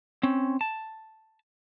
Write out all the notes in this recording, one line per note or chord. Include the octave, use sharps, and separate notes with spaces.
C4 C#4
A5